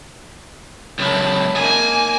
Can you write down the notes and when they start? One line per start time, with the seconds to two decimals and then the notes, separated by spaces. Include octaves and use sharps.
0.99 C#2 F#2 E4 A5
1.56 A#3 D#4 G#5